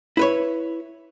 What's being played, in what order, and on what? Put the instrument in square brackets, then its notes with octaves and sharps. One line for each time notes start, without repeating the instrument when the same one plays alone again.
[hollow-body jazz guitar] E4 B4 C#5